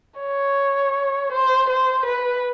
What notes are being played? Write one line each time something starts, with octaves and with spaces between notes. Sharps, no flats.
C#5
C5
C5
B4